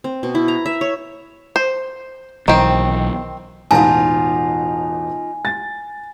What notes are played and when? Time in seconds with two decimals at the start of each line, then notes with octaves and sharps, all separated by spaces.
0.04 C4
0.23 B2
0.35 E4
0.48 A#5
0.66 E5
0.81 C#5
1.56 C5
2.48 B1 D#3 E3 C4
3.71 E1 A1 D#4 F4 G#5 A5
5.45 A6